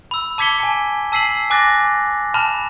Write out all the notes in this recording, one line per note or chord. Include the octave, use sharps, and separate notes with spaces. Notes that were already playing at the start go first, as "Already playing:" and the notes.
B5 E6
A5 D6 G#6 B6 C#7 G7
G#5 A5
A5 E6 B6 C7 D#7 F#7
G#5 D6 F#6 A6 A#6
A5 B5 F6 E7